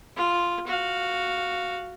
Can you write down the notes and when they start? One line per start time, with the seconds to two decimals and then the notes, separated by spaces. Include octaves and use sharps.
0.17 F4
0.67 F#4 F5